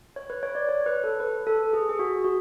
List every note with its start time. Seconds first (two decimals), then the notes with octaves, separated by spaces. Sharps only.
0.16 C#5
0.30 B4
0.43 C#5
0.55 D5
0.69 C#5
0.86 B4
1.04 A4
1.20 B4
1.47 A4
1.73 G#4
1.89 G#4
1.99 F#4
2.24 F#4